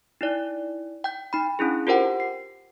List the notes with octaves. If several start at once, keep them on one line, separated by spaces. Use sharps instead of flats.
D#4 E4 D5
G5 G6
D#4 B5
C#4 D4 E4 G#4
F4 G4 A#4 C5 F#5 G5
C7